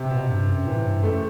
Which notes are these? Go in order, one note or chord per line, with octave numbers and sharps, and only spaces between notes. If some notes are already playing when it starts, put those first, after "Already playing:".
Already playing: C3
B2
G2
F#2
A2 E3
G2
F#2 A3